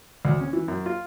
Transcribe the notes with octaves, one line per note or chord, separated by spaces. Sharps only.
D2
C#4
E3
F#2
F4